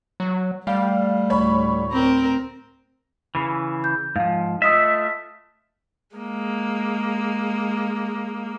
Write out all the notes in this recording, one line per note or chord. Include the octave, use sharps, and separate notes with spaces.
F#3
G3 A3 F5
D2 A2 C#5 B5
C4 A#4
C#3 E3
G6
G#2 F3 F5
A3 F4 D#5 E5 D#6 E6
G#3 A#3